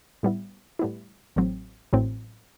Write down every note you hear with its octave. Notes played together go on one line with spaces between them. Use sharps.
A2 G3 B3 E4
A2 G3 B3 E4
A1 A2 F#3 C4
A1 A2 F#3 C4